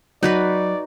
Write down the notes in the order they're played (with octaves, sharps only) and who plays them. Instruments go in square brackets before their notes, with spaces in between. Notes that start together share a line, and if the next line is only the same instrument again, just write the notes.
[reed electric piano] F#3 [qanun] D#4 F#4 B4 [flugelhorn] D5